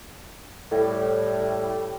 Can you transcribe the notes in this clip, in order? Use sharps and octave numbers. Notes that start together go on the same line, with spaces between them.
A2 G3